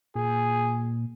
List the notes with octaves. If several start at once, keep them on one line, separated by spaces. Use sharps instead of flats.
A#2 G#4